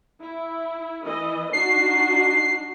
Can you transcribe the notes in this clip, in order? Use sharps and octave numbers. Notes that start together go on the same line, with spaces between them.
E4
E3 D#5
D4 D#4 F#4 C7